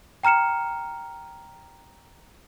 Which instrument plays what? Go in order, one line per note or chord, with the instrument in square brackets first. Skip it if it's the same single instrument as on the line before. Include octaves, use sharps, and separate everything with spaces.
[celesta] G5 A#5 F6 C#7 E7